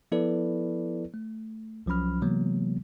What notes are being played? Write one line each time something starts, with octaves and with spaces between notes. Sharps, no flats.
F3 B3 E4 A4 B4 D5
A3
C2 F3 F#3 C#4 B5 F6
C3 E3 F#3 G#3 A#3 B3